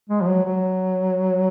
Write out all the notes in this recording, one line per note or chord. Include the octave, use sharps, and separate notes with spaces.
G#3
F3
F#3
F#3